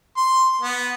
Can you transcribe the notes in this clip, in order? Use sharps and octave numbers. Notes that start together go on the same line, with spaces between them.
C6
B3